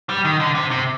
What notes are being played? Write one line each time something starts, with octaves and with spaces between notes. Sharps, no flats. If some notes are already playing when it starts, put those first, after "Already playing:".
G3
D#3
D3
C3
C3